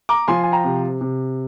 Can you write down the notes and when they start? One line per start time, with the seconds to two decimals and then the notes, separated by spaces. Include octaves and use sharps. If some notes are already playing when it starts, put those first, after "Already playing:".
0.09 A#5 D6
0.28 F3 G#5 C6
0.43 G#5
0.52 G5 A#5
0.64 C3
1.01 C3